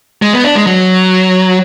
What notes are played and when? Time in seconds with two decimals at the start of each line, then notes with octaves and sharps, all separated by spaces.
0.22 G#3
0.33 B3
0.44 D4
0.55 G#3
0.67 F#3